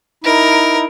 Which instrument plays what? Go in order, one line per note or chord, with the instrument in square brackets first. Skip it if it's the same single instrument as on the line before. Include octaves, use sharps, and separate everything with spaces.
[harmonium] D#4 E4 [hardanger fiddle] A#4